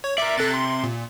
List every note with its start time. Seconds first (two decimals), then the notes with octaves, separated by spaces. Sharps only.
0.04 C#5
0.18 A#4 D5 E5
0.37 C3 A4 F#6 A6
0.54 C6
0.84 A#2